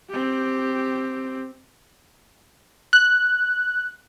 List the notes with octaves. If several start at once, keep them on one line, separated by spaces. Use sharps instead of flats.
C4 G4
F#6